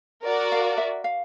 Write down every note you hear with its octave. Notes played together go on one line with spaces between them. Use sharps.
F#4 A#4 D5
F5
E5
F5